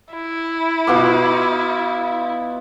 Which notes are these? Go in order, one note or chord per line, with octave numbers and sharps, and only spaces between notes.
E4
B2 F4 D6